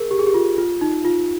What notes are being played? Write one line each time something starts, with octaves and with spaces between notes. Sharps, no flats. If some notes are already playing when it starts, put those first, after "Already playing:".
Already playing: G#4 A#4
G4
G#4
G4
F4
F4
D#4
F4